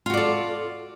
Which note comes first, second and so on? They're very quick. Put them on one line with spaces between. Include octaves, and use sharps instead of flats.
F4 F#4 D5 A4